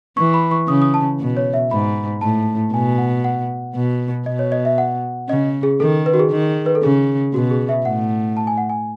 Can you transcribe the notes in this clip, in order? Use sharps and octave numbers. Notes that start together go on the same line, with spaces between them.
E3 C#6
B5
C#6
C#3 D#6
D#6
A5
B2
C#5
E5
G#2 B5
A2 A5
B2 G#5
F#5
F#5
B2
B2 D#5
C#5
D#5
E5
F#5
C#3 D#5
G#4
D#3 A4
B4
F#4
G#4
D#3
B4
A4
C#3 G#4
B2 F#4
G#4
E5
A2 F#5
A5
G#5
F#5
G#5